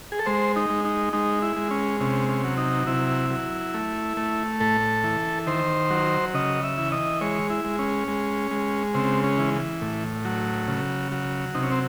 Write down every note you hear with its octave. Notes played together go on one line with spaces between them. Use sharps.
G#4
A4
G#3 C5
D#4
G#3
D#4
G#3 D#4
E4
G#3
C#4
C3 C#4
C#4
F#3
D#4
C3 E4
F#3
A3
A3
A2 A4
E3
D#3 C5
F#3
C#3 D#5
E5
E3
D#5
G#3 C#5
E4
G#3
C#4
G#3
G#3
C#3 C4
C#4
E3
A2
F#3
C#3
F#3
C3 D#4
C#4
C4